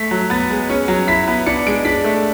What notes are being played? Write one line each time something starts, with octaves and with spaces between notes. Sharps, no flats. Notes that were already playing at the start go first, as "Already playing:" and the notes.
Already playing: A3 B6
F#3
B3 A6
G#3
C#4
F#3
E4 B6
B3
D4 C#7
G#3 D7
D4 B6
A3